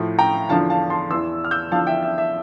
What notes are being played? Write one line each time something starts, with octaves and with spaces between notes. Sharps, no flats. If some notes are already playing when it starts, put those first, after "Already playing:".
Already playing: A2 F3
G5 A#5
E2 D3 F3 F5 A5
F5 A5
A5 C6
E2 E3 C6 E6
F6
E6 G6
E2 D3 F3 F5 A5
E5 G5
E5
E5